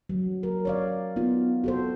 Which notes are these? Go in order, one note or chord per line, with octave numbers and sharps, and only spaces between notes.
F#3
A#4
C#5 D5 F5
B3 D#4 F4
F#4 A4 C5